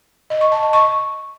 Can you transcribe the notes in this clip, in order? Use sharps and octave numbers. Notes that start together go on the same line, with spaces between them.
D#5
C#6
A5
D#5
C#6